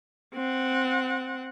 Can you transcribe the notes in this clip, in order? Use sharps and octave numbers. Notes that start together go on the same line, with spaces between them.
C4 F#5